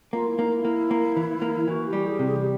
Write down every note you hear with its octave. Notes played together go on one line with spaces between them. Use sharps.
A#3 F4
E4
A#3 D#4
E4
A#3
A#3
E3
A#3
E3 F#4
G4
G3
G#4
C3
G#4
G4